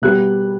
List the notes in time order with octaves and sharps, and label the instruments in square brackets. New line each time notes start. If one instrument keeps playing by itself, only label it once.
[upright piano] B2 G3 B3 F#6